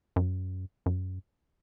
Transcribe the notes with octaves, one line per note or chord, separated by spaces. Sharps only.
F#2
F#2